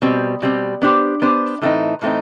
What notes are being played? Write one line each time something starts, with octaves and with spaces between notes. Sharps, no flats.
B2 G3 C4
B2 G3 C4
B3 D4 G4 C5
B3 D4 G4 C5
A2 E3 A3 C4 D#4
A2 E3 A3 C4 D#4